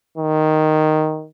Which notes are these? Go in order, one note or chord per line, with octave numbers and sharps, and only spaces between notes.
D#3